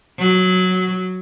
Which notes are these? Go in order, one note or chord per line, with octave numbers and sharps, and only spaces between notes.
F#3